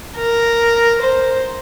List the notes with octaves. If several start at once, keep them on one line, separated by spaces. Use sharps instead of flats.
A#4
C5